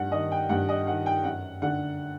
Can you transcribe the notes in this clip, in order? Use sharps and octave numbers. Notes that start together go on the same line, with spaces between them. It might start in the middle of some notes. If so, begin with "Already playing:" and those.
Already playing: G2 F#5
D#3 D#5
G5
G2 F#5
D#5
D#3 F#5
G5
F#2 F#5
D3 F#5